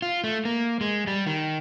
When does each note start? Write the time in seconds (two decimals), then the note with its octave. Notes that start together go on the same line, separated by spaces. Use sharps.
0.02 F4
0.24 A3
0.45 A#3
0.81 G#3
1.07 G3
1.26 D#3